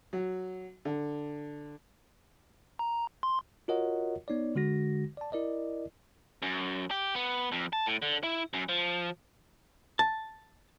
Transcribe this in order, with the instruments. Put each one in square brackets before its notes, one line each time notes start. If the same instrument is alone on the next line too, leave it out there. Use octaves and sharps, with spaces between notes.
[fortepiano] F#3
D3
[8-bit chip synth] A#5
C6
[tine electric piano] F4 F#4 A#4 C#5 D#5 F#5
B3 D#4 C#5 D5
D3 G#3 F#4 A#6
D5 A5
E4 A#4 D5 D#5
[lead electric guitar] F#2
G4
B3
F2
A5
A2
D3
E4
F#2
F3
[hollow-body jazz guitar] A5